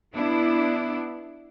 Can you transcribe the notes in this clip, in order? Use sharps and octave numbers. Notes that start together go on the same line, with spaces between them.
B3 D4 E4